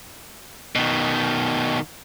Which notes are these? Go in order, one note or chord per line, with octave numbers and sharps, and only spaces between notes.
B2 D#3